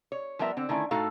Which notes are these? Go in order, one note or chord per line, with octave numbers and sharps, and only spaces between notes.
C#5
F3 G3 B3 A#4 E5
D3 C4
D3 D#3 A3 C#4 E4
A2 A3 D#4 F#4 A4 F5